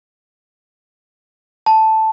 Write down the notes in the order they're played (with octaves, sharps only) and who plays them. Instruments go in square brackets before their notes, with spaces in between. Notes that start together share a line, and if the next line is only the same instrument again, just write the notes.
[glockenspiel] A5